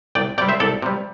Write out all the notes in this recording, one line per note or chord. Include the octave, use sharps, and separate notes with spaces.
C2 D5 G5
C3 G3 D5 G5
C5 E5
C2 A4 D5
C3 G3